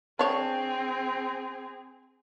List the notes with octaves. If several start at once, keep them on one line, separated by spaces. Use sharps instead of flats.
C4 D4 G#4 C#5